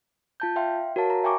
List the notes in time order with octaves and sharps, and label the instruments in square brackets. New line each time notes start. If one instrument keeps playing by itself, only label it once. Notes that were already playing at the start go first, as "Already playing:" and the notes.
[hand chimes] F4 A5 G6
E5 F5 G5 C6
F#4 A#4 C#5 F5 A5
A#5
E5 G5 G#5 A#5 C#6 D6